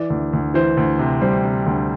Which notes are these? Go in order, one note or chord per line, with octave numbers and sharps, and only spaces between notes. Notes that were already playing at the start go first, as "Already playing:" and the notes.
Already playing: E3 D5
D2
D2
E3 C5
D2
C3
G3 C5
C3
D2